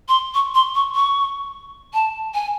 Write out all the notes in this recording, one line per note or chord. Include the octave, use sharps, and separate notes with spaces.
C6
C#6
C6
C#6
C#6
A5
G#5